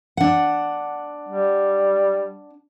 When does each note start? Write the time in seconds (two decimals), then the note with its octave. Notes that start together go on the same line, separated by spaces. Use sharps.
0.17 D4 F#5
1.28 G3